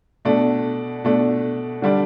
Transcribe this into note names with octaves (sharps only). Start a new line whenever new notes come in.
B2 A3 D4
B2 A3 D4
D3 G3 D4